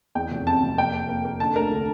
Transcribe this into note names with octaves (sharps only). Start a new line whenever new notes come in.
E2 G5
F1
C3 A5
F1
A#3 G5
A#3
A#3
A#3
D3 A5
D2 A#4
D3